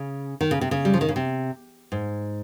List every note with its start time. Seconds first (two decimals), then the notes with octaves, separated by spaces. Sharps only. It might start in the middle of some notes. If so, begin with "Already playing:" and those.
Already playing: C#3
0.41 D#3
0.51 C#3
0.61 C3
0.71 C#3
0.85 G3
0.94 F3
1.01 D#3
1.09 C#3
1.16 C3
1.92 G#2